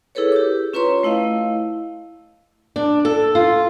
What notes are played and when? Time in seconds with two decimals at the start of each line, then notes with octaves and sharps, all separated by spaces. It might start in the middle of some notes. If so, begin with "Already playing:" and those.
0.15 E4 G#4 A4 B4 C#5
0.32 G4 D6
0.73 C#4 F4 B4 C#5 A#5 C6
1.03 A3 E4 D#5 F5
2.76 D4
3.05 A4
3.35 F4